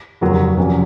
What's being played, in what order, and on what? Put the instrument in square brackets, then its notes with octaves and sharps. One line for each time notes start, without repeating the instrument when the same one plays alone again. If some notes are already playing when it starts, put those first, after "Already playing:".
[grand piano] F1 D#2 C#3 F#3 A#3
F1 F2 C3 F#3 C#4